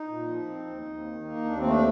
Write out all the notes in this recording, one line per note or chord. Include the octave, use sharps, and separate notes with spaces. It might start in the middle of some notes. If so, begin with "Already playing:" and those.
Already playing: D#4
A#2
F3
C4
D#2
D#2
D#3
A#3
D#2 D4
C4
A3
D4